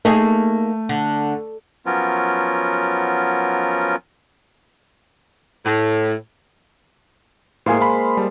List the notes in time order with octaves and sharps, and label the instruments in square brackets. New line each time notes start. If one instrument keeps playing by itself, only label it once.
[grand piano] A3 [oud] A#3 D#4 G#4
[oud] D3
[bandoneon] F3 F#3 B3 C#4 F4 A#4
[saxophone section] A2
[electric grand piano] A2 F5 G#5 [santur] G#3 A#3 C5
[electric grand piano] F5 B5 C6
[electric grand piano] G3 [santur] A5